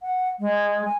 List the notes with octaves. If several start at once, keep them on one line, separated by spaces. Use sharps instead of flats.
F#5
G#3
G#5